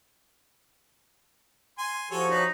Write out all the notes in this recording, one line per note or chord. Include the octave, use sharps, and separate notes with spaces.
G#5 C6
F3 F#4 G4 A4 C#5 G#5
D#4 B4 C#5